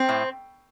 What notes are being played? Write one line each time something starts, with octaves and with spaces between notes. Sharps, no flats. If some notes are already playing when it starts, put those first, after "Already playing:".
Already playing: C4
A2